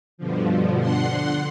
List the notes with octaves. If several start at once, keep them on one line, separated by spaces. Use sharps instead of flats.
G2 B2 D3 F3
D3 F#5 C6